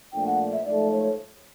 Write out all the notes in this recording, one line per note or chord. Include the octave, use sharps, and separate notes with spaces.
A#2 F3 A3 D4 G5
F#5
E5
G#2 F3 A3 D5
C#5